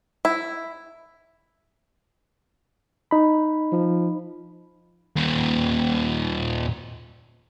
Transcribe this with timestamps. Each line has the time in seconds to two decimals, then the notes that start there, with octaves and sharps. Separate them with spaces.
0.25 E4
3.11 D#4 B5
3.72 F3
5.16 D#2 A#2